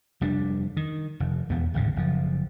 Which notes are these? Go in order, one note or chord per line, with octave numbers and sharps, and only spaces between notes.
F1 G3 D4
D#3
F1
E1 E2 B3
D1 G#1 C#3
F#1 F3